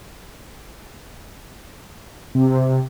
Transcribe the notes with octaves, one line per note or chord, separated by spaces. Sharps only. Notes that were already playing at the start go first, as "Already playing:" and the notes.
C3